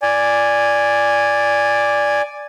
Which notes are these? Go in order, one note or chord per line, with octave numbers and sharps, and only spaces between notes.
D5 G#5